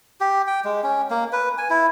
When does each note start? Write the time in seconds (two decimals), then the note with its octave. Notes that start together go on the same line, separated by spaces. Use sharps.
0.21 G4
0.47 G5
0.65 G#3
0.83 C#4
1.10 A#3
1.33 B4
1.58 G#5
1.70 E4